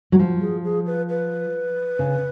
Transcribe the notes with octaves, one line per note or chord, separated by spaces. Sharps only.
F#3
F3
G#4
G#4
B4
B4
C#3